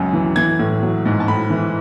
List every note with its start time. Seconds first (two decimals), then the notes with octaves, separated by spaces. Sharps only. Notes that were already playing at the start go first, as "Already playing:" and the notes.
Already playing: C#2 F#2 F#3
0.13 E3
0.36 E3 G#6
0.59 A2
0.83 F#3
1.06 G#2
1.20 A5
1.28 A2 B5
1.50 E3